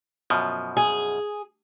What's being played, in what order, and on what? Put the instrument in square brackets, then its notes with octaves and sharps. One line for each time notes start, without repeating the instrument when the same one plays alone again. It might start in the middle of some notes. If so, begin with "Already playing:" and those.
[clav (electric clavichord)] F#2 B2 F3
[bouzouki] G#4